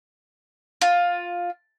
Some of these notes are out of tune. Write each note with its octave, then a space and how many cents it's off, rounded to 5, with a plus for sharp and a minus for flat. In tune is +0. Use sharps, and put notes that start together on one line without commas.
F4 +10